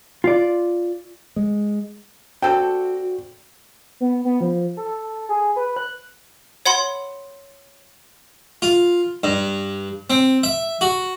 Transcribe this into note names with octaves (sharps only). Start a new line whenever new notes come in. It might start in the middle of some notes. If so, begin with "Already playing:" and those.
F4 D5
G#3
D3 C4 F#4 A4 G5
B3
B3
F3
A4
G#4
B4
F#6
C#5 F#5 B5 C6
F4
G2
C4
E5
F#4